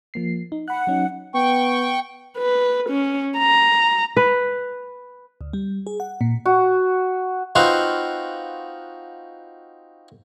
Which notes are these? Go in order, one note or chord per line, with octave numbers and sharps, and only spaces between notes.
F3 A#3 C7
D#4
F#5 B5 F#6
F#3 C#4 D#4
B3 G5 C#6
B4
C#4
A#5
B4
D2
G3
G#4
F#5
A#2
F#4
C4 D#4 F4 F#4 B4 F5